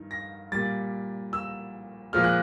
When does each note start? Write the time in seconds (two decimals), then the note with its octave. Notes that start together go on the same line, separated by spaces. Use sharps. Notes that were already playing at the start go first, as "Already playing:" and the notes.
Already playing: G2 D#3
0.11 A#6
0.52 A#2 G3 A6
1.33 E6
2.13 A#2 F3 G#3 F6
2.24 F#6